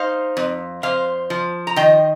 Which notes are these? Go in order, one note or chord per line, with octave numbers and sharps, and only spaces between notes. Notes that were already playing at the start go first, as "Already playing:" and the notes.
Already playing: D#4 C5 F5
F2
F2 C5 F5
F3
A#5
D#3 D#5 G5